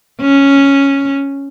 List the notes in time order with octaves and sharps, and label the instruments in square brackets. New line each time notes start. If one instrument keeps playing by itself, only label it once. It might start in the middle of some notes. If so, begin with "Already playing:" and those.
[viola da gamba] C#4